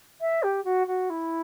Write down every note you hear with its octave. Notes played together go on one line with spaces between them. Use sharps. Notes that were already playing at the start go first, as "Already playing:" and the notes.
E5
G4
F#4
F#4
E4